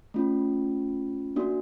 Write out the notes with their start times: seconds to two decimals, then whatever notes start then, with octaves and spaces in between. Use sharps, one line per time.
0.14 A3 C#4 F4
1.36 A#3 D4 F#4